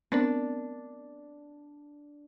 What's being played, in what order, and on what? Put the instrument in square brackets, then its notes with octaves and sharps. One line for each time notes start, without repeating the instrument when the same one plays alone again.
[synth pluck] B3 C4 A#4 [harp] D4